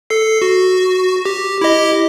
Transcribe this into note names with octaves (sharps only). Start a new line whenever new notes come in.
A4 C7
F#4
G4
E4 G4 D#5